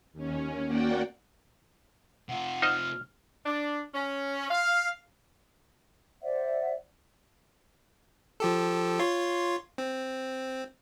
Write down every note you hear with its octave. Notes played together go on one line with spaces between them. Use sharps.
D#2 C#4
A#3 F#4 D5 F#5 G5
C3 F4 F#5
D#4 C5 D#5 F6
D4
C#4
F5
C5 D5 E5 F#5
F3 G4 A4
F4 C#5 C6
C4